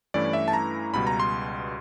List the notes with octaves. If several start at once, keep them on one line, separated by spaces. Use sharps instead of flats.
G2 E3 A3 C#4 E4 D5
E5
A5
A#5
C#2 B2 G3 B5
A#5
C6